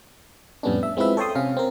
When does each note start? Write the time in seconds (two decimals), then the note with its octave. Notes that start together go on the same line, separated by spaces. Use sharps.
0.63 F2 A2 G3 B3 C#4 D4
0.83 E5
0.97 G#3 C4 E4 F4 B4 E5
1.17 A4 C#5 G5 A5 C6 D#6
1.35 C3 C#4 F5
1.57 C4 A#4